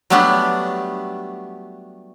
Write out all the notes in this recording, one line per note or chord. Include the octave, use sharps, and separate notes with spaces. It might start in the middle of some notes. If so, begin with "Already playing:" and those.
F#3 G3 A3 B3 D4 G4